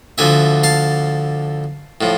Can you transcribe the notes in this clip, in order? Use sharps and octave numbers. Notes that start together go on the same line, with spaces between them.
D2 D3 F3 E5 G#5
F5 A5
A2 F3